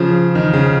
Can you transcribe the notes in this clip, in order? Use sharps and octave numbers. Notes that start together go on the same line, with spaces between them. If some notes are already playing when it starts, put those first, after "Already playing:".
Already playing: C#3 F3
D#3
C#3